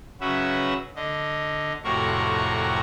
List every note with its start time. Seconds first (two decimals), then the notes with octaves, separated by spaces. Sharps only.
0.21 C#3 F#3 C#4 F#4 B4 E5
0.96 D3 D#5
1.84 F2 A2 C3 F#4 A#4 C#6